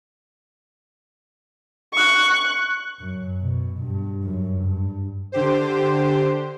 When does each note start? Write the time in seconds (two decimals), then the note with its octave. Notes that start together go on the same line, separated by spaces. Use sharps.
1.92 C#6 F#6
3.00 F#2
3.41 B2
3.82 G2
4.24 F#2
4.64 G2
5.32 D3 G4 C5